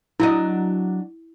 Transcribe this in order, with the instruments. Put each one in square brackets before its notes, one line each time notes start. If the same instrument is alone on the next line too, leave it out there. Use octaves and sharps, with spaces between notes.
[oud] F#3 D4 D#5 [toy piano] E4